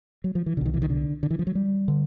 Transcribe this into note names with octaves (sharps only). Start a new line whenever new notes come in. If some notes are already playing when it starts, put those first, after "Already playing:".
F#3
F3
E3
C2 B2 D3 D#3
E3
D#3
D3
D3
E3
F3
F#3
G3
D3